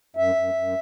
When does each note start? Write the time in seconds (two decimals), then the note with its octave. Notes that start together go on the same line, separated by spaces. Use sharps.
0.16 F#2 E5
0.35 F#2
0.54 F#2